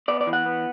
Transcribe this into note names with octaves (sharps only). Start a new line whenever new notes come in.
B3 D5
D5
E3
F#5
B3